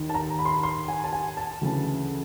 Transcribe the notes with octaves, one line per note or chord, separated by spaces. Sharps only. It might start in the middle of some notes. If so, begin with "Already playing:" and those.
Already playing: D#2 D#3
A5
A#5
B5
C6
B5
C6
G#5
A5
G#5
A5
D2 C#3 E3